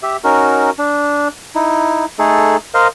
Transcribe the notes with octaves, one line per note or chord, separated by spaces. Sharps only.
G4 E5
C#4 D#4 F#4 A#4
D4
D#4 E4
A3 D#4 G#4 A4
A#4 C5 D#5 F5